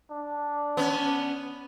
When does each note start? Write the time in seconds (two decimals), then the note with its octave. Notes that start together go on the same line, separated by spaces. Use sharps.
0.11 D4
0.77 B3 C#4